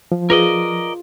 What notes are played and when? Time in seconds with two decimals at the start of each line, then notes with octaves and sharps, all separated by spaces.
0.12 F3
0.30 F4 G#4 A#4 B4 D5 D#5